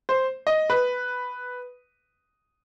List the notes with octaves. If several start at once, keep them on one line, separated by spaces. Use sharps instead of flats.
C5
D#5
B4